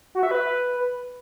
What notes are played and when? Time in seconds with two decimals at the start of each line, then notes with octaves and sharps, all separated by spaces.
0.15 F#4
0.23 E5
0.31 B4